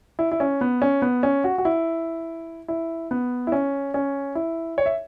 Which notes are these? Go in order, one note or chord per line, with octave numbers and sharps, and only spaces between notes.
E4
E4
C#4
B3
C#4
B3
C#4
F#4
F#4
E4
E4
B3
E4
C#4
C#4
E4
C#5
E5